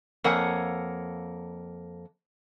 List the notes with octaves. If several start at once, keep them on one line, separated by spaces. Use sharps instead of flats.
F2 A#3 C#5 F#5 G#5